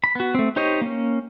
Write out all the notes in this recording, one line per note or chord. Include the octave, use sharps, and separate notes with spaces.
B5
B3 F#4
A3 C4
D#4 G4 C5 C#5 D#5
A#3 C#4